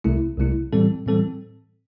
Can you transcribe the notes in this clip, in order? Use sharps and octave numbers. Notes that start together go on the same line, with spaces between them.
C2 C3 A3 E4
C2 C3 A3 E4
A2 E3 G3 C4 A4
A2 E3 G3 C4 A4